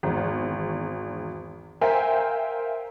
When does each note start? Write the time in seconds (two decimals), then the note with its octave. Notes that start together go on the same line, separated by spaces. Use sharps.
0.03 G#1 E2
1.81 A#4 C5 E5 F5 G5 G#5